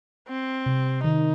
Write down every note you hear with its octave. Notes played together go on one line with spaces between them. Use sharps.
C4
C3
D#3 D#4